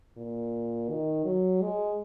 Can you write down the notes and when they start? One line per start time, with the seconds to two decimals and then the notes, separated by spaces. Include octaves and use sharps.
0.17 A#2
0.90 D#3
1.25 F#3
1.61 G#3